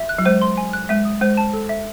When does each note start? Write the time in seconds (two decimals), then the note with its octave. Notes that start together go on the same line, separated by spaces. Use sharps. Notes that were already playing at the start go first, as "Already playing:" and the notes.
Already playing: E5
0.09 F#6
0.18 F#3
0.25 G#3 C5
0.42 C6
0.57 G#5
0.73 F#6
0.89 G#3 E5
1.05 D#6
1.21 G#3 C5
1.37 A5
1.53 A4
1.69 E5